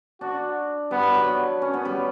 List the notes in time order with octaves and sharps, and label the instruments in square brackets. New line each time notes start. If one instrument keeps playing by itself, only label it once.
[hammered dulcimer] D4 [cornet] F#4
[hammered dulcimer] G3 [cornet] B3
[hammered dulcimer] G3
F#3
C#4
B3
G3